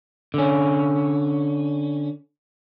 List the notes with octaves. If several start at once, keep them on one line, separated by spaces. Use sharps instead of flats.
D3 C#4